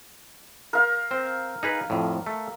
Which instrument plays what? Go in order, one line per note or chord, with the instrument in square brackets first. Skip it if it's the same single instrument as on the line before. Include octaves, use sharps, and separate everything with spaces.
[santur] A#4 F5
[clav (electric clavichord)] C4 C5
D#4 G#4 B4
F2 A2
A3